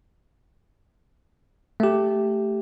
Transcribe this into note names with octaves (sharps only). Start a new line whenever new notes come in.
A3 G4